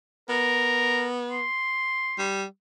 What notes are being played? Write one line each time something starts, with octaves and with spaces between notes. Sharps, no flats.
B3 A#4
C6
G3